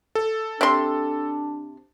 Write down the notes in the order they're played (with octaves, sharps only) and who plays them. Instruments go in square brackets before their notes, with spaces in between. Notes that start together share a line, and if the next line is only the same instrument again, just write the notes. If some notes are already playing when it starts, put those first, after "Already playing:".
[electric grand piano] A4
[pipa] C3 C6 [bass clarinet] D4